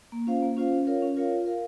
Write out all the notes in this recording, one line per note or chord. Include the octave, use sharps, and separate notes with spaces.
A#3
C#4 F4 C5 F5
A#3
C#4 F4 C5 F5
C#4
F4 A#4 C#5 F5
C#4
F4 A#4 C#5 F5
F4
A#4 F5